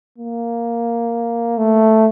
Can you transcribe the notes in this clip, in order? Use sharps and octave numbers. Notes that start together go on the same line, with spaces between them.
A#3
A3